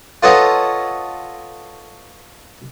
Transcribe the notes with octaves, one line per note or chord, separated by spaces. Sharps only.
F4 A4 B4 C#5 D#5 F#5